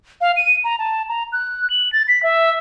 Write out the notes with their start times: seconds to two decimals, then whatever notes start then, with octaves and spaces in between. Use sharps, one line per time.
0.21 F5
0.36 D#7
0.64 A#5
0.79 A5
1.09 A#5
1.33 F#6
1.70 F#7
1.93 A6
2.08 B6
2.23 E5